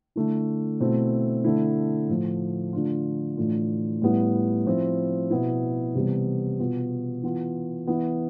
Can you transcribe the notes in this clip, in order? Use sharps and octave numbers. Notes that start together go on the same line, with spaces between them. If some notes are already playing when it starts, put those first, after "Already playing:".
D3 A3 E4
B2 A3 C4 E4
D3 A3 E4
A2 F3 A3
D3 A3 D4 F4
A2 E3 A3 D4 F4
A2 G3 B3 E4
F3 C4 E4
B2 B3 E4
C3 E3 G3 B3
B2 B3 F4
E3 B3 F4
E3 B3 E4